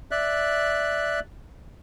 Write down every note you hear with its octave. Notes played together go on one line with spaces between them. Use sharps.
D5 E5 F#6